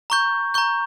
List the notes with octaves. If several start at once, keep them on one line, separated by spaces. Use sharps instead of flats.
A#5 C#6 G6
A#5 C#6 G6